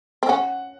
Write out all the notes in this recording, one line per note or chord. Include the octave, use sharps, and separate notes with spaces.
C4
C#4 F#5